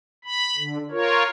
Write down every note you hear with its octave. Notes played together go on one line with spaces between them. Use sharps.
B5
D3
F4 A#4 C#5